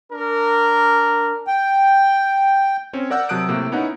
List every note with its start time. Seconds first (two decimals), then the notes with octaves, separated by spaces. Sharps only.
0.12 D4 A#4
1.47 G5
2.93 C4 C#4 C#5
3.10 A#4 D5 F#5 E6 F#6 G6
3.29 C3 F#3 A5 D#6 F#6 D7
3.48 A2 C3 A#3
3.72 B3 C#4 D#4 E4 C#5 F#5